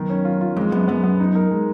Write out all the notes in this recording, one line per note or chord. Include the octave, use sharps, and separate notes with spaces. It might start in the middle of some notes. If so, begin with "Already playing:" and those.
Already playing: F#2 D#3 B3
C#4
F4
F4
F2 G#3
F#2 B3
F#2 B3
B3
D#4
A#4
G#3